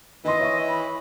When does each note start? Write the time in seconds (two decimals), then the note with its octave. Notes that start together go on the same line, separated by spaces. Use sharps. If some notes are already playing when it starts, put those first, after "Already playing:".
0.25 D#3 E3 D#5 C6
0.40 C#5 E5 C#6
0.68 B5